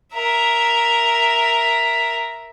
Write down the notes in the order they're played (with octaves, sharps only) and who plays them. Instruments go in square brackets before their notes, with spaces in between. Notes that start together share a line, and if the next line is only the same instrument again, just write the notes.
[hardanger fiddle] A#4 E5